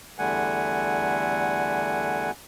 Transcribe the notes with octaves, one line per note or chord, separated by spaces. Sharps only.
E2 D3 G3 A3 F#5 G#5